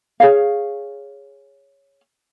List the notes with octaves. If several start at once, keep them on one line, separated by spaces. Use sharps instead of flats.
G#4 C#5 F5